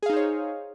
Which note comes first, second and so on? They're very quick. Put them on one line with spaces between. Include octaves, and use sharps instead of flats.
G#4 F5 D#4 C5 C#5